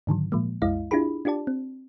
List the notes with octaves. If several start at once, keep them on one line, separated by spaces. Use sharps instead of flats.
G#2 D3 D#3 F#3
A#2 F3 G#3 A#3
C2 F#2 G#3 E4 D#5 F5
D4 E4 F4 G4 G#4 B5
D4 F4 G4 D5 A5
C4